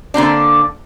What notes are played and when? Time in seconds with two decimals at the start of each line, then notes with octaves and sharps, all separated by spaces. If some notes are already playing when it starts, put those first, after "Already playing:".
0.14 D3 A#3 C4 D4